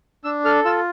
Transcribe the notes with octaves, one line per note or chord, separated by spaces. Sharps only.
D4 E6
A4 F6
F4 E6